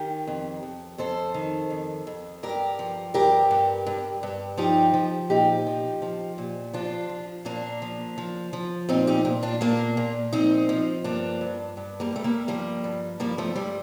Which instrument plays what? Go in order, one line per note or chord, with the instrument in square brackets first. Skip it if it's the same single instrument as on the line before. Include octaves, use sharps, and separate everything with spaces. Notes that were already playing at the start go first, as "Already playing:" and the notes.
Already playing: [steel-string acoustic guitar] D#3 G4 A#4
F2
F2
F2 A4 C5
D#3
F2
F2
G2 G4 A#4
F3
G2 G4 A#4
G2
G2
G2
F3 D#4 G4
F3
A#2 D#4 G4
F3
F3
A#2
F3 D4 F4
F3
A#2 A#3 D4
F3
F3
F3
A#2 C4 D#4
D#4 G4
A#2
D4 F4
A#2 A#3 D4
A#2
F3 C4 D#4
F3
G2 A#3 D4
G2
G2
G3 A#3
G2 A3
G3 A#3
F3 G3 A#3
G2
F3 G3 A#3
F3 A3
G2 G3